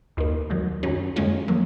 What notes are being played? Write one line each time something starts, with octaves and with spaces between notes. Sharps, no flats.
D#2 D#3 A#3
D#2 D#3 F#3
F#2 D#3 F#3 C#4
F2 D#3 G#3 C#4 F4
F#3 A#3